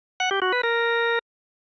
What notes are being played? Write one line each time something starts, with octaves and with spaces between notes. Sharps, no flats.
F#5
G4
F#4
B4
A#4